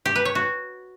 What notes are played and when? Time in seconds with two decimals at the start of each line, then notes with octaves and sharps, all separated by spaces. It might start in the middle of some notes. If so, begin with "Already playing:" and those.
0.06 G4
0.15 B4
0.25 C#5
0.35 F#4